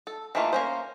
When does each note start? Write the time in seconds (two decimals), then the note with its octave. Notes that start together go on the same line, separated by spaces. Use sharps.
0.07 A4
0.35 D#3 E3 A3 A#3 F4
0.53 A#3 C#4 C5